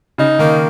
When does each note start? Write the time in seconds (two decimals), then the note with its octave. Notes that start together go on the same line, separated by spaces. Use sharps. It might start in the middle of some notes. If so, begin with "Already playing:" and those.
0.18 C#3 D#4
0.39 D#3 A#3